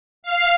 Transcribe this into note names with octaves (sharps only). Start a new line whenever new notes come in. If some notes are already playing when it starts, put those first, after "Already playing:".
F5